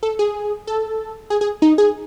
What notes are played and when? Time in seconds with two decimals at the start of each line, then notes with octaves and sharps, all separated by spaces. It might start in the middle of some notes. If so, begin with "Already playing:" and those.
0.03 A4
0.19 G#4
0.67 A4
1.30 G#4
1.41 G#4
1.62 D#4
1.78 G#4